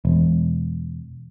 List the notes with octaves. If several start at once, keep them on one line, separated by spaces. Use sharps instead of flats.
E1